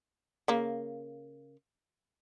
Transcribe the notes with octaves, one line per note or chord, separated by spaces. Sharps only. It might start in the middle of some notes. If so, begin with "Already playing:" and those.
C#3 A#3